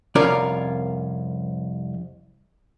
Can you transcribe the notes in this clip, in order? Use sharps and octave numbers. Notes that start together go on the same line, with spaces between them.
C2 F2 C#4 F4 A#4 D5